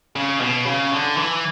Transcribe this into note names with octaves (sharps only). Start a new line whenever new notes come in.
C#3
B2
C#3
D3
E3